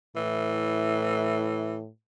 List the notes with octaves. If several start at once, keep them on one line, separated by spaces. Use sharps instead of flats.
A2 E3